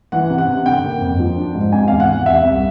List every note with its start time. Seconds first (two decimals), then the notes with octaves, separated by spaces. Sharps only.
0.12 E3 F#5
0.30 C3
0.38 F#5
0.48 C3
0.66 D3 G5
0.84 A#3
1.01 F2
1.19 F3
1.37 D4
1.54 G#2
1.72 C3 G#5
1.88 E2 F5
2.00 F#5
2.08 E2
2.26 C3 E5
2.44 C2